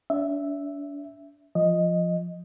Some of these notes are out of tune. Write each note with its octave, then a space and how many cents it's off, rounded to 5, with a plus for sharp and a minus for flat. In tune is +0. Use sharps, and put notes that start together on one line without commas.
D4 -40 E5 +0
F3 +0 D#5 +0